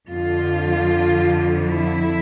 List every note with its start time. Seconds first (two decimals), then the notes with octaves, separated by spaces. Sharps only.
0.10 F2 D3 F3 F4
1.70 E4